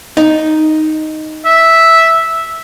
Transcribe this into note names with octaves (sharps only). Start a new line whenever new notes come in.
D#4
E5